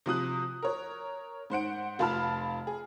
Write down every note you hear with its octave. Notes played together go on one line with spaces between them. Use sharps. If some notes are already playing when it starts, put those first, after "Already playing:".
C3 F3 D#6 F#6
A#4 C#5
G#2 C5 F#5 D7
F1 F4 A5 B5 F6
G#4